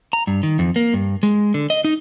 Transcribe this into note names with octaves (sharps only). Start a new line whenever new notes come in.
A#5
G2
D#3
F2
A#3
G2
G#3
D3
D#5
D#4